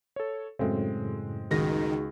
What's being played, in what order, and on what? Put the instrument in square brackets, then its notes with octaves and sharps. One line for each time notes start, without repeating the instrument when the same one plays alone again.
[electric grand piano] A4 C#5
[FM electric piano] F#2 A2 C#3 [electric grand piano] G#3 C4
[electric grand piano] C#2 A#6 [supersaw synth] D#3 [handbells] D#4 F#4 G#4